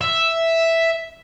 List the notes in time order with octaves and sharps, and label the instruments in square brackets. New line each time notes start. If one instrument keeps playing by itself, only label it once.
[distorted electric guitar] E5